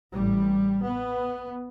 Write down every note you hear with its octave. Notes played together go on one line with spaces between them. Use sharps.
A1 A2 G3
B3